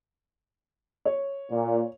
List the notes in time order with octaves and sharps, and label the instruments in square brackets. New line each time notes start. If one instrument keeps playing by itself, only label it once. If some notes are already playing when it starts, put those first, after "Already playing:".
[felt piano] C#5
[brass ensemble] A#2